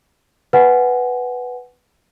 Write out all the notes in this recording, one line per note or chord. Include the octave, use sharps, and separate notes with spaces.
B4 F#5 G#5